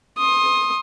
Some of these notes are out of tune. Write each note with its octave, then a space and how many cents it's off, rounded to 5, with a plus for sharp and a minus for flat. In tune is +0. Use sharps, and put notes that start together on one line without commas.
C6 +30 D#6 +0